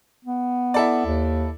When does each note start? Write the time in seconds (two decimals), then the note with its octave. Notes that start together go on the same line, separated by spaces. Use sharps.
0.25 B3
0.74 E4 A4 D5
1.06 D#2